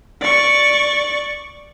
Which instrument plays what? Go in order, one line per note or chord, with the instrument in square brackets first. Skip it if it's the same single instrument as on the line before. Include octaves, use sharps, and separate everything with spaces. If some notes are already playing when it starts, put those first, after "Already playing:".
[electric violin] D5 C#6